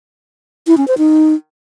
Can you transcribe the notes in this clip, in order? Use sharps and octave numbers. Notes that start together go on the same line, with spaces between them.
E4
C#4
C5
D#4